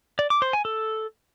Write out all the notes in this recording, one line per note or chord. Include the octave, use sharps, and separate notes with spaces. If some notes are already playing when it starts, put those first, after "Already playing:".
D5
D6
C5
G#5
A4